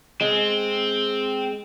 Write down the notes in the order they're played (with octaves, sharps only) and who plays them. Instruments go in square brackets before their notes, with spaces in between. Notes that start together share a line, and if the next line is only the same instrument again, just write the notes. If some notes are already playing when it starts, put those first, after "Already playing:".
[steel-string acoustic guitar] G#3 [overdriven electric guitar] C4